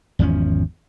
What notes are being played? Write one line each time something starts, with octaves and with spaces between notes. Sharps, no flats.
G#1 E2 F3 C#4